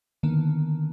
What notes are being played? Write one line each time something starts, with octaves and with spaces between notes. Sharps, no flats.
D3 D#3 A#3 B3